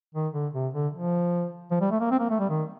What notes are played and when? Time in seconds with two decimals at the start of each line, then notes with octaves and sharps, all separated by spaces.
0.15 D#3
0.34 D3
0.53 C3
0.74 D3
0.93 F3
1.71 F3
1.81 G3
1.91 A3
2.00 A#3
2.11 C4
2.20 A#3
2.30 A3
2.39 G3
2.50 D#3